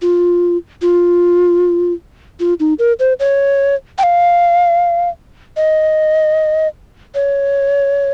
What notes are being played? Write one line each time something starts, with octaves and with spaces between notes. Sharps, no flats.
F4
F4
F4
D#4
A#4
C5
C#5
G5
F5
D#5
C#5